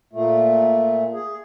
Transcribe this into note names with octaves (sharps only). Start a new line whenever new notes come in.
A#2 A3
G#4